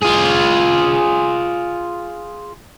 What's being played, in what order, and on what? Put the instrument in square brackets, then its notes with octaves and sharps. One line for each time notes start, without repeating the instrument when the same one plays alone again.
[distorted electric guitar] F4 G#4